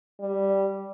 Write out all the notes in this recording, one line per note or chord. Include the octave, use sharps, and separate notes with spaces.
G3